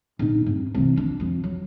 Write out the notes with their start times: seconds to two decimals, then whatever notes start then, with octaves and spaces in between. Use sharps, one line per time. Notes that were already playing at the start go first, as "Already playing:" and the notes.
0.19 A#1 D#4
0.46 G2 C4
0.75 C2 E3
0.96 F2 D4
1.20 F2 F3
1.44 F#3